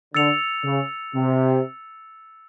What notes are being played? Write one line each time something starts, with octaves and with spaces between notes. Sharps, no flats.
D3 E6 A6 C#7 F7
C#3
C3